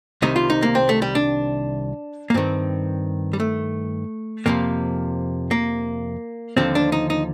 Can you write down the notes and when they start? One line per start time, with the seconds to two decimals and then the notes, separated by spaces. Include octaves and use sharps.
0.22 C2 C3 D#3 D#4
0.36 F4
0.50 D#4
0.62 A#3
0.75 C4
0.89 A3
1.02 G3
1.15 D4
2.30 A#3
2.34 G2 D#3 C4
3.33 G3
3.40 A3
4.46 F2 C3 F3 A#3
5.51 A#3
6.57 D#2 D3 F3 C4
6.75 D4
6.92 D#4
7.10 D#4